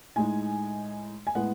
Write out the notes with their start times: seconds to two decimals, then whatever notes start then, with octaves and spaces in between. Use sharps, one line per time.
0.16 A2 G#3 D#4 G#5
1.27 G#5
1.35 A2 G#3 B3 E4 F#5